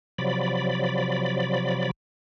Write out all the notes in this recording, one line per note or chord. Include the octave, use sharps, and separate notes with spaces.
C3 F3 F#3 D5 B5